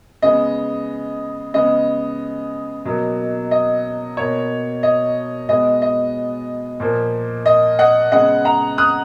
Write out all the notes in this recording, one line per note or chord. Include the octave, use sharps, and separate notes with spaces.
C#3 G#3 B3 D#5
C#3 G#3 B3 D#5
B2 F#3 A#3
D#5
B2 A#3 C#5
D#5
B2 G#3 B3 D#5
D#5
A#2 F3 A#3
D#5
D#5 F#5
C#3 G#3 B3 D#5 F#5
F#5 A#5
D#6 F#6